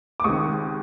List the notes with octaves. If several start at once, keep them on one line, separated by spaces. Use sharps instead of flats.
D6
C#2 C3 D#3 C#6 D#6